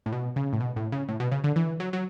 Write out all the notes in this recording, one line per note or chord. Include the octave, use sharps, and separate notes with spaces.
A2
B2
C#3
A2
B2
A2
C#3
A2
B2
C#3
D3
E3
F#3
F#3